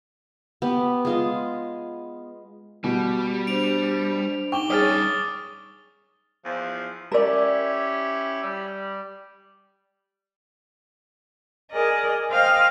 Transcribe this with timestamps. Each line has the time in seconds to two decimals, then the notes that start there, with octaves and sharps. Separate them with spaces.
0.62 B3 G4
1.05 G#3 F4 G#4
2.84 B2 G3
3.47 D4 G4 C5 D7 F7
4.52 D#4 G5 C#6 D6 G7
4.70 G2 C#4 G#4 C#5 D#6 F6 A6
6.43 E2 F3
7.12 C#4 E4 G4 A#4 D5
8.41 G3
11.72 G#4 A#4 D5 D#5
12.31 C5 D#5 F5 G5 F6